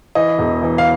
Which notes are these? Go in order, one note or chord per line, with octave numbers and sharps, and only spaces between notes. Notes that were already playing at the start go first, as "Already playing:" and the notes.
E3 D#5
E1
E3
F5